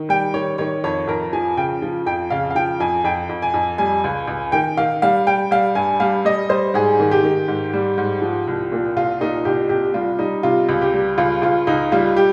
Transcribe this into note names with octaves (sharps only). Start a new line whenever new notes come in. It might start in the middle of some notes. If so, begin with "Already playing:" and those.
Already playing: D#3
G3 G5
D#3 C#5
D#3 C#5
F2 C#5
F2 A#4
F3 G#5
C#3 G5
F3
F2 G5
C#3 F5
F5
F3 G5
F2 G#5
F2 G5
F2
G#5
F2
G3 G#5
C#2
C#2
D#3 G5
D#3 F5
G3 F5
G3 G5
G3 F5
G2 G#5
G3 F5
G3 D#5
G3 C5
G#2 G#4
D#3
G4
D#3
G#2
G3
G#2
F3
C2
A#2
C2 F4
A#2 D#4
C2 G4
C3 G4
G3 F4
G3 D#4
C3 F4
C#2
G4
G3
C#2 F4
C#2 F4
C#2 D#4
G3 F4
G4